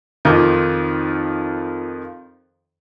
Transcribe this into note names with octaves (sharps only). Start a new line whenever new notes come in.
F2 D#3 F3 D#4 F4 D6